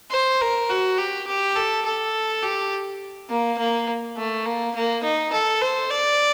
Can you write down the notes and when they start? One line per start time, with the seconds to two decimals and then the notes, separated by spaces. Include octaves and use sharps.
0.11 C5
0.41 A#4
0.70 F#4
0.98 G4
1.27 G4
1.56 A4
1.85 A4
2.43 G4
3.30 A#3
3.58 A#3
4.17 A3
4.46 A#3
4.75 A#3
5.04 D#4
5.32 A4
5.62 C5
5.91 D5